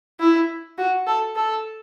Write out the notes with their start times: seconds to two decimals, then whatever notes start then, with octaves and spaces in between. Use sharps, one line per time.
0.20 E4
0.78 F#4
1.07 A4
1.36 A4